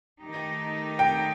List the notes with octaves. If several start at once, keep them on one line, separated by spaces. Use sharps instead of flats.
D#3 A3 D#4 G4
G5